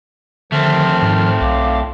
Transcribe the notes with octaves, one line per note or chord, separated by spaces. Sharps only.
D3 D#3 F3 A3 C4 F6
G#2
B1 F5 D6